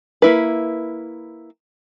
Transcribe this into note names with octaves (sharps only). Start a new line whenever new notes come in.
A#3 E4 B4